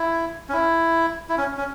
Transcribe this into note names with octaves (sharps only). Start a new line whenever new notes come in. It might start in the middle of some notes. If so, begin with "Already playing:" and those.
Already playing: E4
C#4
E4
E4
C#4
C#4